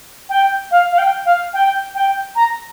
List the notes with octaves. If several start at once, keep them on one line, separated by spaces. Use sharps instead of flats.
G5
F5
F5
G5
F5
G5
G5
A#5